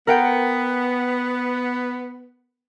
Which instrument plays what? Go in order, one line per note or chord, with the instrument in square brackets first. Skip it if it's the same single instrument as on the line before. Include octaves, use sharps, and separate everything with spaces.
[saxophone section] B3 [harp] A#4 F#5 G5